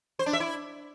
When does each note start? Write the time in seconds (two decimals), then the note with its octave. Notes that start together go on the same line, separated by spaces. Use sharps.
0.19 C5
0.26 D4
0.33 E5
0.40 E4